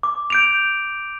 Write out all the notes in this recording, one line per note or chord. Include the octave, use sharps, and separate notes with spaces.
D6
G6 D7 F7